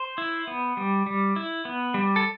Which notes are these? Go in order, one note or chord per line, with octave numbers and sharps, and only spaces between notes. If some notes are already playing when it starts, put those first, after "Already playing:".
Already playing: C5
E4
B3
G3
G3
E4
B3
G3
A4